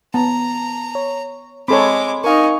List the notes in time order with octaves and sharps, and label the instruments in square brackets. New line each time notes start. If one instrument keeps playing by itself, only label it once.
[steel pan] B3 [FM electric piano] A5 [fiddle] A#5
[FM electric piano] C#5
[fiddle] G#3 D6 [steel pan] C4 A4 C#5 [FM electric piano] B5 C6
[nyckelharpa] D#4 C#6 [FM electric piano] A#4 F5 [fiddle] G#5